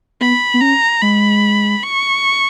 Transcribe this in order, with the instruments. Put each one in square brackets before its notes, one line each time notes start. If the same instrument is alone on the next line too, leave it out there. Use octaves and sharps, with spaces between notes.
[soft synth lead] B3 [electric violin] B5
[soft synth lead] B3
[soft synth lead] C#4 [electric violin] A#5
[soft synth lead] G#3 [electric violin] B5
[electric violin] C#6